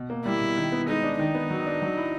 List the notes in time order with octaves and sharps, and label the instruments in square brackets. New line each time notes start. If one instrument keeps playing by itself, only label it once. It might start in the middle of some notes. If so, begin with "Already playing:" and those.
Already playing: [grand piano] B2
A#3
[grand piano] G3 [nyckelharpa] E4
[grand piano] B2
D#3
B3
[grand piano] G#3 [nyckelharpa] D#4
[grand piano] D4
[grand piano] D#3 [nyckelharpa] D#4
[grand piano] B3
F#3
D4
F#3
E4